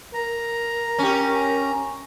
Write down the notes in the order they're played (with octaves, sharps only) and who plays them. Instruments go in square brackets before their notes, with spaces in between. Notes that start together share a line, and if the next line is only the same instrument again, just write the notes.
[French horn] A#4 [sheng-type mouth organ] A#5
[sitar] C#4 G4